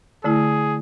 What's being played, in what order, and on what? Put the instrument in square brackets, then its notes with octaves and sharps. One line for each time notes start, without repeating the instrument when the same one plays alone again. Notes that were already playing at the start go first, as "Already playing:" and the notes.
[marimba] D3 A3 E4 [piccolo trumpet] G#4